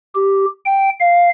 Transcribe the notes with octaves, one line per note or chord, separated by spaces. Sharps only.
G4
G5
F5